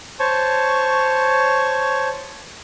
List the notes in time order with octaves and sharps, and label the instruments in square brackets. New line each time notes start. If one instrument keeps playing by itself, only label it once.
[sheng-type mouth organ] C5 C#5 A5 C#6